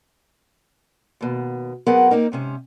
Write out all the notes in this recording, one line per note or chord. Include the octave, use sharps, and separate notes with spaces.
D#2 B2
F#3 B3 C4 G#4 A#4 F#5
A#3 C4 D#4 A#4
G#2 C3 C#4